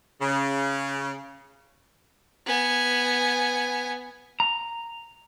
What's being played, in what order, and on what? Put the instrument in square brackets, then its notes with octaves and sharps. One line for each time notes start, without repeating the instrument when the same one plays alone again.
[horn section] C#3
[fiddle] B3 G#5
[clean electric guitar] A#5